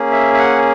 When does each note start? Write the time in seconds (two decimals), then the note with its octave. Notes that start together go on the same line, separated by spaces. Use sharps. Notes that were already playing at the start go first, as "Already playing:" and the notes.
Already playing: A#3 C#4 G#4
0.12 E5
0.34 E5
0.39 F#5